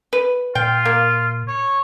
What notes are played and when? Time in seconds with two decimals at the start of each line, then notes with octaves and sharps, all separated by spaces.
0.13 B4
0.55 A#2 F4 G5
0.85 A#3
1.48 C#5